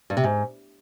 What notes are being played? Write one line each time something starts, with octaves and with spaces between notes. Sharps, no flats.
G2
C3
G#2